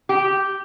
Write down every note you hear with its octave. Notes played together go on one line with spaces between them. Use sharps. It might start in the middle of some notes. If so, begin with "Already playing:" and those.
G4